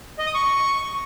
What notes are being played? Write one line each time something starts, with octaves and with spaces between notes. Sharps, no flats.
D#5
D#6
C#6